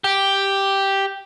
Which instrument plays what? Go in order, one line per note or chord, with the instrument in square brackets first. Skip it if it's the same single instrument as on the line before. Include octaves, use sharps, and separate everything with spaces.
[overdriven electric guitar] G4